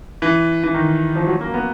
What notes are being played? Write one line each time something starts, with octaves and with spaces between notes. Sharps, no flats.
E3
E3
D#3
F3
F#3
A#3
B3